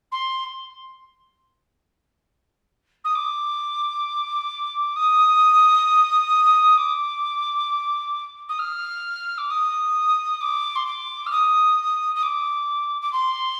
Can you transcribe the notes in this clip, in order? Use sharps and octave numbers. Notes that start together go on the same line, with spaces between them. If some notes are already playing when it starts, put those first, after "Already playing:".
C6
D#6
D6
D#6
D6
D#6
F6
D6
D#6
D6
C6
D6
F6
D#6
D#6
D6
D6
C6